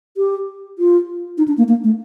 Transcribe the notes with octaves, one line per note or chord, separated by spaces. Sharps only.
G4
F4
D#4
D4
A#3
A#3
A3